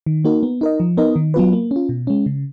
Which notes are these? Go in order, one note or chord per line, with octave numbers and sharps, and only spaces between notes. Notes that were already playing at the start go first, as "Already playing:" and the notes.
D#3
A#3 D#4 F#4 A#4
B3
D#4 A#4 D#5
F3
B3 D#4 A#4 D#5
D#3
F#3 B3 F4 B4
A#3
C#4
F4
B2
G#3 C#4
C#3